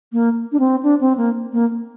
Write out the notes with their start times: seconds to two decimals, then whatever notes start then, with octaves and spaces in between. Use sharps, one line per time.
0.13 A#3
0.52 D4
0.60 C4
0.83 D4
1.01 C4
1.17 A#3
1.53 A#3